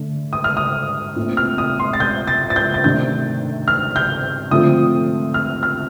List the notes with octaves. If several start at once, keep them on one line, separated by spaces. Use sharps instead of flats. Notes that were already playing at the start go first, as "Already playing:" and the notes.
Already playing: D3 A3 D4
D#6
F6
D#6
A#2 A3 C4
F6
D#6
C6
A6
G6
A6
A6
G6
A6
C3 D#3 A3 D4 G6
F6
G6
D3 F3 A3 C4 F4 D#6
F6
F6